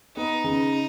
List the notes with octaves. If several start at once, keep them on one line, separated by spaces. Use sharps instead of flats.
B3 D#4
C#3